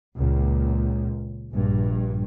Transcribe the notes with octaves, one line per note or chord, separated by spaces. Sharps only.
C#2 A#2
A#1 G2